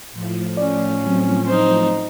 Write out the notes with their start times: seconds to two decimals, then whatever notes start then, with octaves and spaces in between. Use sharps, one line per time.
0.13 A2 F3
0.57 C#4 D5
1.06 F#3 C4
1.46 D#4 C5